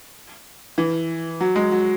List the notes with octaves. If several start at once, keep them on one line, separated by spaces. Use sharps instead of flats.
E3
F#3
G#3
F#3